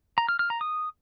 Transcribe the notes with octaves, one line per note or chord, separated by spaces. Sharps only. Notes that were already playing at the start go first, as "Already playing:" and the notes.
A#5
F6
F6
A#5
D#6